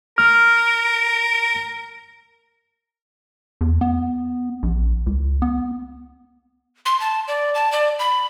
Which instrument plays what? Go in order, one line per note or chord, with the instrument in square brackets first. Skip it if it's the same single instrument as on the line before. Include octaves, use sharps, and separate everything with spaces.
[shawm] A#4 [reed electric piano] F6
[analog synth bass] E2
B3
A#1
C#2
B3
[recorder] C6
A5
D5
A5
D5
B5